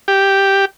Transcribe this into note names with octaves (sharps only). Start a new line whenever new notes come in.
G4